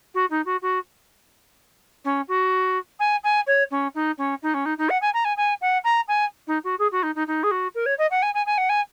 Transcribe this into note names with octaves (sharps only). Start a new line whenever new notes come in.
F#4
D#4
F#4
F#4
C#4
F#4
G#5
G#5
C#5
C#4
D#4
C#4
D#4
C#4
D#4
D#4
F#5
G#5
A#5
G#5
G#5
F#5
A#5
G#5
D#4
F#4
G#4
F#4
D#4
D#4
D#4
G#4
F#4
A#4
C#5
D#5
F#5
G#5
G#5
G#5
F#5
G#5